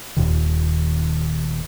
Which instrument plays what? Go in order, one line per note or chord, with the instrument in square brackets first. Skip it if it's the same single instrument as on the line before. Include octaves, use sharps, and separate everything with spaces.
[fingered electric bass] D#1 D#2 A#2 D#3